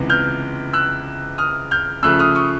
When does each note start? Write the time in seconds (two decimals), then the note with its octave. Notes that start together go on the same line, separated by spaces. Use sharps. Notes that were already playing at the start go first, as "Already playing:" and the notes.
Already playing: C#2 C3 E3 G#3 B3
0.10 F6 G6
0.73 E6 F#6
1.38 D#6 F6
1.71 F6 G6
2.03 C#3 F3 A3 E6 F#6
2.19 D#6 F6
2.35 C#6 D#6